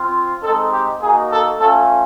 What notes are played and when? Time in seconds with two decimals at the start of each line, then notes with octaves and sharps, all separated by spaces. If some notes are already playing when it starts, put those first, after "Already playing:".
Already playing: C4 F4
0.42 G#3 C4 D#4 A4
0.72 G4
1.01 A#3 D#4 F#4 G#4
1.30 A4
1.59 A3 C#4 F4 A4